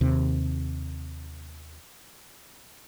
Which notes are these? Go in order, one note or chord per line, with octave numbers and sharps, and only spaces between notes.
D#2 C3